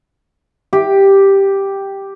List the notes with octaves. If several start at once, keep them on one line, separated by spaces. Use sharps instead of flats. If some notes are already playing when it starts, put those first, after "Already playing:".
G4